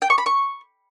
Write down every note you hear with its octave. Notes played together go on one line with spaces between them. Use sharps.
G5
C#6
B5
C#6